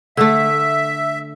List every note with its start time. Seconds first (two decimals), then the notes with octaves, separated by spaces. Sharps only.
0.17 D3 A3 E5 E6